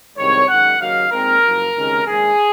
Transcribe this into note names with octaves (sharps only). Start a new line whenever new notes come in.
C2 C3 D#3 G#3 C#5
F#2 D#3 G#3 F#5
D#2 C#3 F#3 A#3 D#4 F5
A#2 G#3 C4 D#4 A#4
F#1 F#2 F3
C#2 C3 D#3 G#3 C#4
A#1 G#2 D#3 G#3 G#4